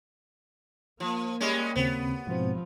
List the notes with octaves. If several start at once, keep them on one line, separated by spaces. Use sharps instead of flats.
F3 A#3
G3 G#3 C#4
D#2 C#3 B3 C4
G#2 B2 F3 C4